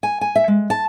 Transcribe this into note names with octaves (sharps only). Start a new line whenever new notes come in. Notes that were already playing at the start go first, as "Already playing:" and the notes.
G#5
G#5
E5
G#3
A5